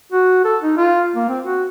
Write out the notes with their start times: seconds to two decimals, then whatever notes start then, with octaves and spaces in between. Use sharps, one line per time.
0.12 F#4
0.45 A4
0.62 D#4
0.77 F4
1.15 A#3
1.29 C4
1.44 F#4